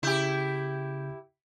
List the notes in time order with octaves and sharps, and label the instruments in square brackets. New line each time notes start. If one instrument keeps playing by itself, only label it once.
[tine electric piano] C#3 G6 [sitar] E4 G4